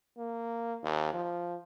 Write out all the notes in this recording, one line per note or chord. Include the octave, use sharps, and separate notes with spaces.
A#3
D#2
F3